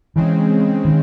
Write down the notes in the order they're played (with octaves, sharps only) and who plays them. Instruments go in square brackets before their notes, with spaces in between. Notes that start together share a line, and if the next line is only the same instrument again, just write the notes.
[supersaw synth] C#3 G#3 C4 [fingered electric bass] E3
[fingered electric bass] D#3